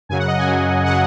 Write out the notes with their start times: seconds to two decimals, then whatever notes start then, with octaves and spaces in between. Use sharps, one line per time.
0.09 F#2 C#3 F#3 G#5
0.19 F#5
0.28 D#5
0.38 G#5
0.47 F#2 C#3 F#3
0.86 C#3 F#3 F#5